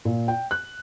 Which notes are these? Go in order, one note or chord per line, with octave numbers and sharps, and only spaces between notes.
A#2
G5
F#6